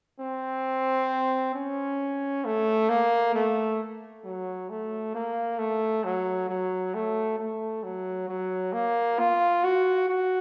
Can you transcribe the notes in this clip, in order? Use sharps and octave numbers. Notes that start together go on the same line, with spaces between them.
C4
C#4
A3
A#3
A3
F#3
A3
A#3
A3
F#3
F#3
A3
A3
F#3
F#3
A#3
F4
F#4
F#4